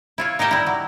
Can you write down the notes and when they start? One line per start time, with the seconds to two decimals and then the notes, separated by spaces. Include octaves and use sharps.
0.18 E4 F4 C#5
0.39 D#4 G4 A#4 D#5 E5
0.51 G3 E4
0.67 F#3